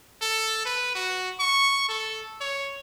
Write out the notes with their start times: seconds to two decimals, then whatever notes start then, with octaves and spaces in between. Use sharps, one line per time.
0.22 A4
0.66 B4
0.95 F#4
1.40 C#6
1.89 A4
2.41 C#5